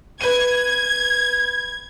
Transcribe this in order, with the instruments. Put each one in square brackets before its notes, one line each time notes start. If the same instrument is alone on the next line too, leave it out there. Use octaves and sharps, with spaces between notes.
[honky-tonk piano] B4 D#7 [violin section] G#6